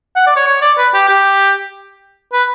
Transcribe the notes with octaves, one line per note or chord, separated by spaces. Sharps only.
F#5
D5
C#5
C#5
D5
B4
G4
G4
B4